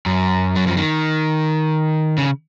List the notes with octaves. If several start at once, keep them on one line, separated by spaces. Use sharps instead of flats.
F#2
F#3
F3
D#3
C#3